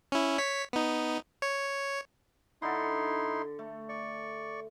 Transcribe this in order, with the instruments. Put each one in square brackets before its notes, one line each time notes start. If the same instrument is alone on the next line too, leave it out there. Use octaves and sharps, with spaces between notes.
[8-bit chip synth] C#4 E4
C#5 B6
B3 D#4
C#5
[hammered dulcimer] D3 A4 [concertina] D#4 E4 C6
[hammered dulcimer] A3
[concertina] D5 C#6